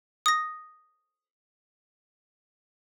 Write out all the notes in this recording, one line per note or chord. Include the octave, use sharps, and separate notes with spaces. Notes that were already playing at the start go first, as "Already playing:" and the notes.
D#6 A#6